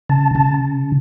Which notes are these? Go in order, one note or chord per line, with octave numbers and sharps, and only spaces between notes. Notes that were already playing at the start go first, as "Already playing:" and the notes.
C#3 A5
C#3 A5